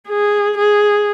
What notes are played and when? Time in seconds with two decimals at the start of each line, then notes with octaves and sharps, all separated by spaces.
0.09 G#4
0.57 G#4